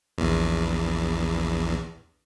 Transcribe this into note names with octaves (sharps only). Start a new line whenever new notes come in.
A#1 E2